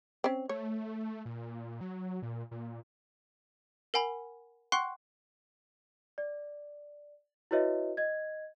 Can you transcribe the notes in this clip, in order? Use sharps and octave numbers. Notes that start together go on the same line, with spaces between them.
C4 C#4
A3 C#5
A#2
F#3
A#2
A#2
A#4 F#5 G#5 B5
F#5 G5 C6 C#6 F#6
D5
E4 F#4 B4 C#5 D#5 E5
D#5 G#6